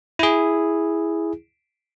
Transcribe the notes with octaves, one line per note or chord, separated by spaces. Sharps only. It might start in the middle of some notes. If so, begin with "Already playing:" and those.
E4 G#4